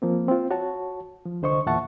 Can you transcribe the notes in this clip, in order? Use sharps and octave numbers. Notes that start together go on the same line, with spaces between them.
F3 A#3 C4
C4 F4
F#4 C#5 A5
F3
C2 D3 C5 D#5 C#6
E2 A#2 E5 F#5 A5 C#6